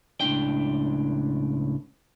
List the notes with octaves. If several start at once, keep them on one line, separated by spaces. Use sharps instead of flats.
C#2 A2 D4 G5